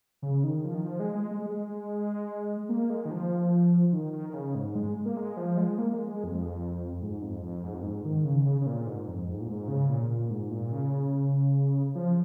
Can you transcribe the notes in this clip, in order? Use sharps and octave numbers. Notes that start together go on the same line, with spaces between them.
C#3
D#3
F3
D#3
F3
G#3
G#3
G#3
G#3
A#3
G#3
D#3
F3
D#3
D#3
D#3
C#3
G#2
G#3
A#3
G#3
F3
G#3
A#3
G#3
G#3
F2
G#2
F2
F2
G#2
F2
G#2
D#3
C#3
C#3
C#3
A#2
G#2
F2
G#2
A#2
G#2
C#3
A#2
A#2
G#2
A#2
C#3
F3